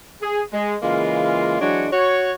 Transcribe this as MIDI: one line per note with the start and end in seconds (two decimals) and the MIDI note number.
0.22 0.41 68
0.53 0.75 56
0.82 1.59 49
0.82 1.59 52
0.82 1.59 56
0.82 1.59 58
0.82 1.59 65
1.60 1.86 52
1.60 1.86 54
1.60 1.86 56
1.60 1.86 62
1.60 1.86 66
1.60 1.86 73
1.91 2.31 66
1.91 2.31 73